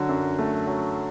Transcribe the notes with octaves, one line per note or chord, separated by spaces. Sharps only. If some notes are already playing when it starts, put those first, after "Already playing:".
Already playing: D3 F#3 F#4
F#2
A3
F#3